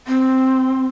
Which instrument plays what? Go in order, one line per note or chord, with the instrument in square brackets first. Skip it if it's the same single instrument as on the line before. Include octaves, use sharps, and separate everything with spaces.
[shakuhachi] C4